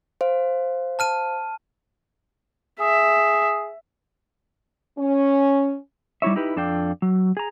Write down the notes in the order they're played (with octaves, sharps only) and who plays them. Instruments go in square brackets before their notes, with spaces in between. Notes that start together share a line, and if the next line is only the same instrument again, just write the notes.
[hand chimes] C5 F5
[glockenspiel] A5 F6 D#7
[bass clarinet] G#4 [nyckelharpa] E5
[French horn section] C#4
[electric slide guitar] G3 D#4 E4 C#5 E5
D#4 E4 G4 B4
F2 D4 A4 D5 F5 G5
F#3
G#4 A#5